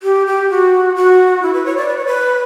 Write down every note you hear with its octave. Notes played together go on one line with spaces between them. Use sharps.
G4
G4
F#4
F#4
E4
B4
C#5
D5
B4
C#5
B4